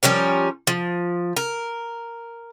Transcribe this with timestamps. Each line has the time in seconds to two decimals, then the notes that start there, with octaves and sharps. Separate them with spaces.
0.03 F3 G3 C#4 A#4
0.67 F3
1.36 A#4